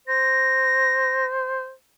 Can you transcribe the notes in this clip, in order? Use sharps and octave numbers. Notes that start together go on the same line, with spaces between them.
C5 A#6